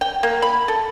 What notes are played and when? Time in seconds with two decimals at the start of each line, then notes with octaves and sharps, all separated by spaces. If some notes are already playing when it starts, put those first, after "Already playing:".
0.01 G5
0.23 A#3
0.42 B5
0.68 A4